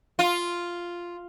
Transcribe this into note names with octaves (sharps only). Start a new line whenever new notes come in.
F4